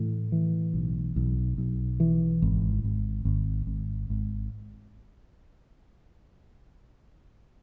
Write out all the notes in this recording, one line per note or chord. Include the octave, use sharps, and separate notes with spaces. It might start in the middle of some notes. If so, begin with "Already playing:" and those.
Already playing: A2 E3
E3
B1
B1
B1
E3
G#1
G#1
G#1
G#1
G#1